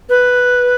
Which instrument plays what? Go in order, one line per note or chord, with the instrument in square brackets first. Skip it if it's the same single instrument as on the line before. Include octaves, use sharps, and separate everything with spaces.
[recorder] B4